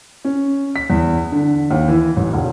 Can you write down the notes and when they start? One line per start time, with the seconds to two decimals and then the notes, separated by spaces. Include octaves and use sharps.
0.25 C#4
0.76 B6
0.90 E2
1.32 D3
1.71 D#2
1.88 E3
2.17 A1
2.33 E1